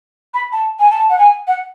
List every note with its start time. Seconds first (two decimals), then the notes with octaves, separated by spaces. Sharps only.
0.34 B5
0.52 A5
0.80 G#5
0.91 A5
1.10 F#5
1.18 G#5
1.47 F#5